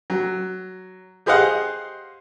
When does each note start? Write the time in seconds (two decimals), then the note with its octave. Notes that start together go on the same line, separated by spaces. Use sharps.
0.10 F#3
1.26 G4 G#4 C5 D#5 F5 F#5